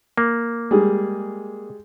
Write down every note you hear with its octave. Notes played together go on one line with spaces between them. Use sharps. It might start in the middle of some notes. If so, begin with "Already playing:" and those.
A#3
G3 G#3 G#4